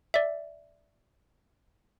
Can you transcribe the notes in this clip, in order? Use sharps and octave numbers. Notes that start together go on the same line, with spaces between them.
D5 E5